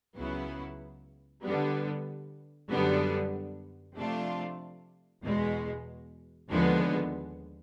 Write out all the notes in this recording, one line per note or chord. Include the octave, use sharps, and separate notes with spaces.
C#2 C#3 F#3 B3 E4
D3 G3 B3
F#2 D3 G3 B3
C3 F3 A3 D4 F4
E2 B2 G#3
D#2 D3 F3 G#3 B3